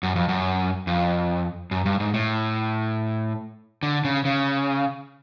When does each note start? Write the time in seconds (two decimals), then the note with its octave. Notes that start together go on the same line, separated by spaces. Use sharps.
0.03 F#2
0.16 F2
0.29 F#2
0.87 F2
1.71 F#2
1.86 G2
2.00 G#2
2.14 A2
3.83 D3
4.05 C#3
4.25 C#3